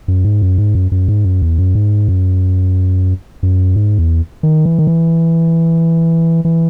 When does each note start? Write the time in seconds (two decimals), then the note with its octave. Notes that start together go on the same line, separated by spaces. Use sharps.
0.08 F#2
0.24 G#2
0.42 F#2
0.58 G#2
0.75 F#2
0.92 F#2
1.08 G#2
1.25 F#2
1.42 E2
1.58 F#2
1.75 G#2
2.08 F#2
3.43 F#2
3.76 G#2
3.98 E2
4.43 D#3
4.65 E3
4.79 D#3
4.87 E3
6.45 E3